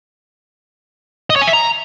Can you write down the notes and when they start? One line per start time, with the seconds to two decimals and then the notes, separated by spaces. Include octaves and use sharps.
1.30 D#5
1.36 C#5
1.42 G#5
1.47 E5
1.53 A#5